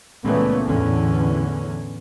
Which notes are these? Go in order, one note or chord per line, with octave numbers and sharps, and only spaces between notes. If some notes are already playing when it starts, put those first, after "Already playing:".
C#2 A#2 E3 A3 B3 C#4
E2 A2 D3 E3 C#4